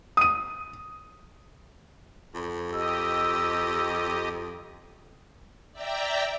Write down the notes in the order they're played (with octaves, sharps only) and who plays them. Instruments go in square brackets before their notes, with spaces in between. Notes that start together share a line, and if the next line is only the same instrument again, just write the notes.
[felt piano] D#6 D#7
[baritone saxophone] F2
[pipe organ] G4 D#5 [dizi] E6
[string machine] D5 E5 G5 A#5